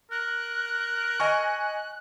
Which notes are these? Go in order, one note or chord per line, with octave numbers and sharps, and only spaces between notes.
A#4 F#6
D#5 G#5 C#6